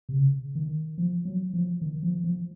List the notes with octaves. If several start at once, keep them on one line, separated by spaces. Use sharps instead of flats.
C3
C#3
D#3
F3
F#3
F3
D#3
F3
F3